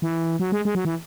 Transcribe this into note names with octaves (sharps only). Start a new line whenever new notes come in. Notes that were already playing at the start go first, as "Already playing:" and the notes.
E3
F#3
G#3
G#3
F#3
E3